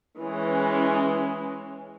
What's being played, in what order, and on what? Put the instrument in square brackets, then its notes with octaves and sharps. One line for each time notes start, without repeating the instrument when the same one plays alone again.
[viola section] E3 G#3 C#4